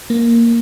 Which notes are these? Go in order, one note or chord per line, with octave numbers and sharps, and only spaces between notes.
A#3